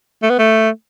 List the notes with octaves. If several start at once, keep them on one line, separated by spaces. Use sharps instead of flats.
A3
B3
A3